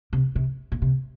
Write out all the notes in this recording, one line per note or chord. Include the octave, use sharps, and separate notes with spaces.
C3
C3
A#2
C3